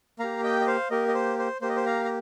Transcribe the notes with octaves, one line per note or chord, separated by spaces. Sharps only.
A#3 G4 F5 A#5
D#5 G5
D#5
C5 F5
A#3 G4 A#4 D#5
D#5
C5
C5
A#3 G4 C5
D#5
C5
F5 A#5
A#5